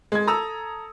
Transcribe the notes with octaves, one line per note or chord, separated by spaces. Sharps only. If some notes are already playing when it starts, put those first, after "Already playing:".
G#3 G#6
A4 A#5 D#6 E6